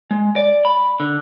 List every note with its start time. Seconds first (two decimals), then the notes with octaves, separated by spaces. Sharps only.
0.11 G#3
0.36 D5
0.65 B5
1.00 D3